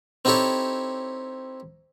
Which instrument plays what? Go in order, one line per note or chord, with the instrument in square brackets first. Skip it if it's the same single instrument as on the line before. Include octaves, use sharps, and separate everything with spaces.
[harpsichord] C4 D#4 E4 G4 A4 C#5